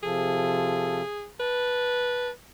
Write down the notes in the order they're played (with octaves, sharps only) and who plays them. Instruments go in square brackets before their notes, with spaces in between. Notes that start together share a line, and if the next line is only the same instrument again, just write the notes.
[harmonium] C3 F3 A4 [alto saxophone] G#4
[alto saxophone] B4 [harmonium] A5